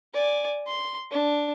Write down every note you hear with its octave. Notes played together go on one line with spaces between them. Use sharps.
D5 G#5
C6
D4